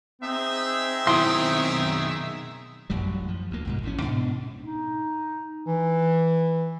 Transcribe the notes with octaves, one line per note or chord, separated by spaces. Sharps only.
C4 D#4 G#4 E5
B1 D#3 E4 C6 D#6
A1 F#2 F#3 G3
F3
D2 A#3
C2 G#2 B2
A1 A2 D3 C#4
G#2 B2 D4
D#4
E3